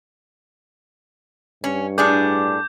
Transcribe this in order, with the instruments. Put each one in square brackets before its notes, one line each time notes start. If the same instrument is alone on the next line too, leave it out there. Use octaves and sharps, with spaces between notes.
[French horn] G2 [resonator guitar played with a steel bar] C#4
[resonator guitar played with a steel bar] A2 D4 G#4 [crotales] D6 G6